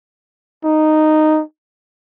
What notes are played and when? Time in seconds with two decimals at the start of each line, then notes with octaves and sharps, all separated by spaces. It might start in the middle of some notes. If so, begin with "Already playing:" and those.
0.65 D#4